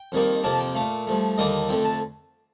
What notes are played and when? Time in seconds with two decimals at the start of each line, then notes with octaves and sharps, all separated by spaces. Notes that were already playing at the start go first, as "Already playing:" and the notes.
Already playing: G5
0.12 F2 D#3 G3 A#3
0.43 F2 C3 F3 A#3 A5
0.59 G5
0.75 A#2 A3 F5
1.07 G2 F3 A3
1.38 D#2 D3 G3 A#3 D#5
1.69 F2 D3 A3 G5
1.85 A5